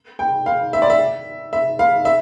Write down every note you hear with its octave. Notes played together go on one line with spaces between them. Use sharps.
G5
F5
E5
D5
E5
E5
F5
E5